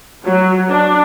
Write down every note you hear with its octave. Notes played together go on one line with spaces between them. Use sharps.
F#3
D4